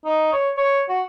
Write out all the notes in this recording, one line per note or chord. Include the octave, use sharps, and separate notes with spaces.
D#4
C#5
C#5
F#4